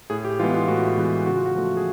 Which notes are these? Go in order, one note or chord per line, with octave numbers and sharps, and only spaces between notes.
A2 G#4
G4
E3 G#3 B3 F4
F4
A2 F#4
E3 G#3 B3
C#3 F#4
F4
F#4
F3 A3
G#4